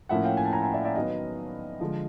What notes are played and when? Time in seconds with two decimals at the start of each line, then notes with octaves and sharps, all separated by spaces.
0.09 A2 F3 A#3 C#4 E5 F#5
0.24 F5 G5
0.37 G#5
0.45 A5
0.53 G#5 A#5
0.63 G#5 A#5
0.74 D5 E5
0.85 D5 E5
0.95 D#3 F#3 B3 D#5 F5
1.80 D3 F3 G#3